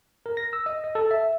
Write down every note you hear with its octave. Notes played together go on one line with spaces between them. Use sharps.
A#4
A#6
E6
D#5
D#5
A4
E5